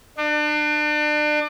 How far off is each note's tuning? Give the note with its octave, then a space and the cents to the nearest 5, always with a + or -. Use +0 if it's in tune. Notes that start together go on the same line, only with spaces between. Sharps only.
D4 +35